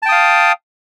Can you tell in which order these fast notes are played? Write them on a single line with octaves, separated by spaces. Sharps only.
A5 G5 D#6 F5